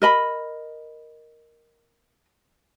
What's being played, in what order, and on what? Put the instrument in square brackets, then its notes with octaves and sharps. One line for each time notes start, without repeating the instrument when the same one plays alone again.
[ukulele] A#4 D#5 B5